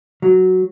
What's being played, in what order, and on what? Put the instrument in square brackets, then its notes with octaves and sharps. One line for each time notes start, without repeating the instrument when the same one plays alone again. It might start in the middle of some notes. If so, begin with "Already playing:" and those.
[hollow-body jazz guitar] F#3